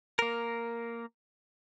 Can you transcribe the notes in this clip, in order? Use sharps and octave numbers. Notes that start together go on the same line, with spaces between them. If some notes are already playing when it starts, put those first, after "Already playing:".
A#3 A#4